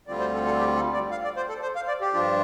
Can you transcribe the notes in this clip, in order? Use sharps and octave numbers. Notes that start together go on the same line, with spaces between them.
D2 D3 G3 C4 F4 D5
C5
A4
A4
G4
A4
D5
F5
D5
C5
A4
C5
F5
D5
G4
G2 F3 D4 F4